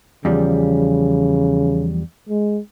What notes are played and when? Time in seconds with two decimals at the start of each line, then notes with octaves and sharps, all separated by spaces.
0.25 E2 C#3 F3 G3
2.29 G#3